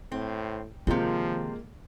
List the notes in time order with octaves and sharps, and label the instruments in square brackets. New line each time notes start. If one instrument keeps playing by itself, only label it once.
[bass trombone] A2 [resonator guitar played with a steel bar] C4
[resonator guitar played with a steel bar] C3 C4 [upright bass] D#3 [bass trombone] F3 [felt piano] G#3 A#3 F4